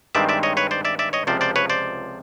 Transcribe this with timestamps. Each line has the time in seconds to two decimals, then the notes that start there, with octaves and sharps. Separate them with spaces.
0.15 G2 D#3 G#3 C4 D5 E5
0.29 D5 E5
0.43 C#5 D#5
0.57 B4 C#5
0.71 C5 D5
0.85 D5 E5
0.99 D5 E5
1.13 C#5 D#5
1.27 C#2 C3 F3 C5 D5
1.41 C5 D5
1.56 B4 C#5
1.70 C5 D5